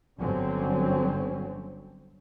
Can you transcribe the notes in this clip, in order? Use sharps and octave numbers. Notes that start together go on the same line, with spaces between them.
G1 G2 D3 F#3 C4 C#4